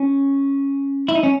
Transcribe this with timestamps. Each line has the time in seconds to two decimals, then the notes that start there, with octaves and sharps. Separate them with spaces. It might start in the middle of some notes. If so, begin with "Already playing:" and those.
Already playing: C#4
1.08 E4
1.15 D#4
1.23 C#4